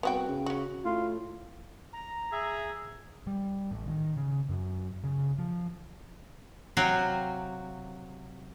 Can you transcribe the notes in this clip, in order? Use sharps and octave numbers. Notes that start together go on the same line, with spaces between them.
C2 B3 F#4 G5
C#3
C#4 F#4
A2 F4
A#5
G#4 E5
G3
A1
D#3
C#3
F#2
C#3
F3
C3 F#3 F#4 F5 G5